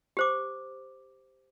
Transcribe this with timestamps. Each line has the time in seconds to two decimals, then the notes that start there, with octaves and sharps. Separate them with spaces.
0.17 G4 C5 D6